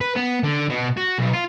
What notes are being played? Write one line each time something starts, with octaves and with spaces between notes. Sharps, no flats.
B4
B3
D3
B2
F#4
B1
F4